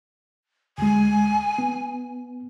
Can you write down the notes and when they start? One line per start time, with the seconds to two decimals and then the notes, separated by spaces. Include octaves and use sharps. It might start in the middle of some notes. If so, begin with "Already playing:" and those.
0.78 D2 G#3 G#5
1.58 B3